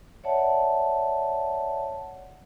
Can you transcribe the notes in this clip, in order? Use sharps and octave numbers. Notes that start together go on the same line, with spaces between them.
C#5 D5 E5 F#5 A5